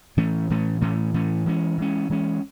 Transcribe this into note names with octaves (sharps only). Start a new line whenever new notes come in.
A2 E3 A3 C#4
A2 E3 A3 C#4
A2 E3 A3 C#4
A2 E3 A3 C#4
E3 G#3 C#4
E3 G#3 C#4
E3 G#3 C#4